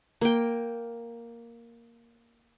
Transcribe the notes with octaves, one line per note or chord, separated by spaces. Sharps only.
A#3 G5